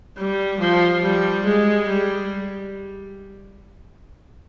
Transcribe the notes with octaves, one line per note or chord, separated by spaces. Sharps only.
G3
F3
G3
G#3
G3